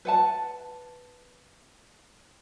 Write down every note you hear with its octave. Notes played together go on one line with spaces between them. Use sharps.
B4 F#5 A5